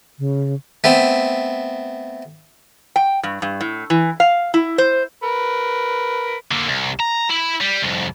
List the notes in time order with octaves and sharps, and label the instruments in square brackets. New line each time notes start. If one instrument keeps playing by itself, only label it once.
[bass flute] C#3
[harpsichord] A3 B3 C4
[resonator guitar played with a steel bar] G5
G2
G2
A2
E3
F5
E4
C5
[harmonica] A#4 B4
[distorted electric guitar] D3 A#3
C2
A#5
E4 B5
G3
C2 F2